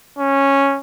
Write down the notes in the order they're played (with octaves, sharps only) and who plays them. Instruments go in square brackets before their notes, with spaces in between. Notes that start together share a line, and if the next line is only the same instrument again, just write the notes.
[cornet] C#4